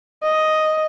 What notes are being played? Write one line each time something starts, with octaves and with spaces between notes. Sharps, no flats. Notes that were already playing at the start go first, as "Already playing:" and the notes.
D#5